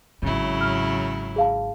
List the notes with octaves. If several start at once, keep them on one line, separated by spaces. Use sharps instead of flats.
G#1 G#2 C#3 F#3 E4
F6
G#4 F5 A5